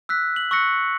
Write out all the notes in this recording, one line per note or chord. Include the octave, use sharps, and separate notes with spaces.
E6 F#6 B6
F#7
C#6 E6 F#6 A#6 C#7